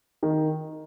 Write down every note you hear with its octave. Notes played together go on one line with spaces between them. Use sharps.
D#3